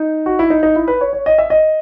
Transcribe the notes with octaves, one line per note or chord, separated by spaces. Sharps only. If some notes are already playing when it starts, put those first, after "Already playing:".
Already playing: D#4
F#4
E4
D#4
D#4
E4
B4
C#5
C#5
D#5
E5
D#5